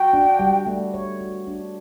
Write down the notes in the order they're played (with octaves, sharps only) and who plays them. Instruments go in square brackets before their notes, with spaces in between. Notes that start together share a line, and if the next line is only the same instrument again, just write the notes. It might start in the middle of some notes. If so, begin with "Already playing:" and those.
Already playing: [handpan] F#4 [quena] G5
[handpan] D4
G3
A3
C#5
F#4
D4